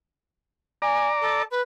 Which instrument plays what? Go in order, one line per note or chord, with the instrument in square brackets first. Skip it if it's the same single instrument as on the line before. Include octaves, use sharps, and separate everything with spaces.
[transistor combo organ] D5 A#5 D6 [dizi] G#5
[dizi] A4
B4